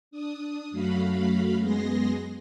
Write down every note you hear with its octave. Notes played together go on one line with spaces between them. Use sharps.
D4 D#6
F#2 F#3 A3 F#4 F5 B5
F#2 G#3 B3 G#4 C6 A#6